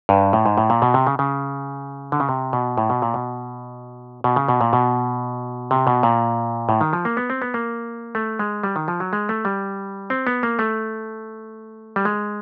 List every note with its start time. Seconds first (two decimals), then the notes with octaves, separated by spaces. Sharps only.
0.09 G2
0.33 A2
0.46 G#2
0.58 A2
0.70 A#2
0.82 B2
0.94 C3
1.07 C#3
1.19 C#3
2.12 D3
2.20 C#3
2.29 C3
2.53 B2
2.78 A2
2.90 B2
3.02 A#2
3.14 B2
4.24 B2
4.36 C#3
4.48 B2
4.61 A#2
4.73 B2
5.71 C3
5.87 B2
6.03 A#2
6.69 A2
6.81 D#3
6.93 F3
7.05 A#3
7.17 B3
7.30 C4
7.42 B3
7.54 A#3
8.15 A3
8.39 G#3
8.63 G3
8.76 D#3
8.88 F3
9.00 F#3
9.13 G#3
9.29 A3
9.45 G3
10.10 C4
10.27 B3
10.43 A#3
10.59 A3
11.96 G3
12.05 G#3